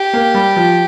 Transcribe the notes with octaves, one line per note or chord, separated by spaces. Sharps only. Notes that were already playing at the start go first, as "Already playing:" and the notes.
Already playing: G4
A#3
G3
F3